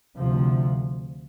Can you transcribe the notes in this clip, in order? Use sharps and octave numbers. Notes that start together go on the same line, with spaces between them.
D2 C3 F3